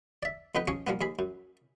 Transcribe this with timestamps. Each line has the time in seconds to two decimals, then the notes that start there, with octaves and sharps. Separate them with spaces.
0.23 D5 E5
0.55 F2 B3 D#4 B4 G5
0.68 F3 C#4 G#4 C#5
0.87 F3 G3 A#3 B3
1.01 D#2 G#4 B5
1.19 F#2